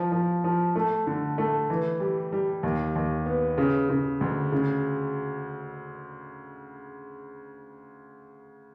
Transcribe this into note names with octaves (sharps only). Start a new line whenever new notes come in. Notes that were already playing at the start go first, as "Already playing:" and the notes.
Already playing: F3
F3
F3
A3
D3
A3
E3
G3
G3
D#2
D#2
B3
C#3
C#3
D2
C#3